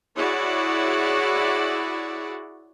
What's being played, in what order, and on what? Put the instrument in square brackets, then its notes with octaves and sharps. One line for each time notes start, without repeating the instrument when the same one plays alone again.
[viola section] E4 F#4 G#4 C#5 D5